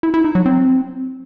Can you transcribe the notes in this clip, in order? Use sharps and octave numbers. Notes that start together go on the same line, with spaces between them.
E4
E4
D#4
F#3
C4